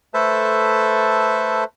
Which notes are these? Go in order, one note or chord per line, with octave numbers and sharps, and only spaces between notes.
A3 A4 B4 C5 E5 A5